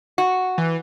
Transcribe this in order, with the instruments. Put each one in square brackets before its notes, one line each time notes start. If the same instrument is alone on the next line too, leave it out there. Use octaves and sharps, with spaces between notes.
[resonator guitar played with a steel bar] F#4
[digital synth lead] E3